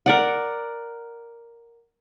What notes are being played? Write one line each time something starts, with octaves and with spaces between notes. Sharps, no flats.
A#4 D5 F#5